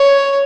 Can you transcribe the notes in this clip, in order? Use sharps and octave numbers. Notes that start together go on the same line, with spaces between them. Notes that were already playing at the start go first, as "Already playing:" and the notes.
Already playing: C#5